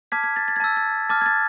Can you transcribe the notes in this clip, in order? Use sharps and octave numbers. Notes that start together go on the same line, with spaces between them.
A5 D6 F6 G#6 B6
G#6
A6
A6
G#6
A5 E6 A6
A6
A5 D6 F6 A6
G#6
A6